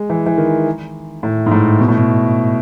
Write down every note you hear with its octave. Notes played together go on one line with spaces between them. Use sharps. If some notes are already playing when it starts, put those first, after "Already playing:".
Already playing: G#3
E3
E3
D#3
A2
G#2
A2
B2
A2
B2